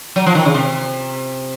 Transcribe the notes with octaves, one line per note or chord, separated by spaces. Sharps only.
F#3
F3
D#3
C#3
C3